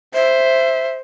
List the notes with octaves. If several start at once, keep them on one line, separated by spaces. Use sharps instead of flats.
C5 E5